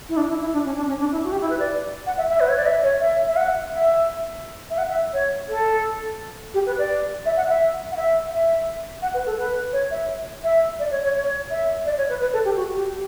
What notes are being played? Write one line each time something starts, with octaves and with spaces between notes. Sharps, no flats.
E4
D4
E4
E4
D4
C#4
D4
C#4
D4
E4
F#4
G4
E4
B4
D5
F#5
E5
E5
B4
C#5
D5
E5
C#5
E5
E5
F#5
E5
E5
F#5
E5
C#5
A4
G4
B4
D5
E5
F#5
E5
F#5
E5
E5
F#5
B4
A4
B4
C#5
E5
E5
D5
C#5
C#5
C#5
E5
D5
C#5
B4
B4
A4
G4
F#4
G4